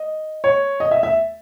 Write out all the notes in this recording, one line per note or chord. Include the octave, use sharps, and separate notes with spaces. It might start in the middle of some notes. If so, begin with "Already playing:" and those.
Already playing: D#5
C#5
D#5
E5
E5